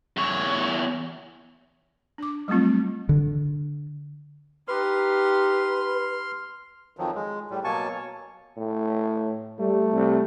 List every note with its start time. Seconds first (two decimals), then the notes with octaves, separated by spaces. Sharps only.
0.17 E2 C#5
2.18 D4 D6
2.48 F#3 G3 A3 C4 F4
3.09 D3
4.68 D#4 G4 B4 C6 F6
6.97 F2 D#3 F3 F#3
7.15 G#3
7.51 A2 G3
7.64 B2 F#3 A#3 G#5 A5 C#6
7.91 C#5
8.57 A2
9.59 G3 A3
9.93 C2